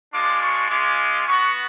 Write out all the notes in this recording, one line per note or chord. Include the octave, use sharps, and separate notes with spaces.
G#3 D4 F4 D6
C#6
G#3 C#4 F4 D6
B3 F#4 C#6